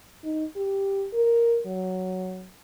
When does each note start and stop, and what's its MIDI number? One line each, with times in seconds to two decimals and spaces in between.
0.24 0.45 63
0.56 1.07 67
1.13 1.61 70
1.66 2.48 54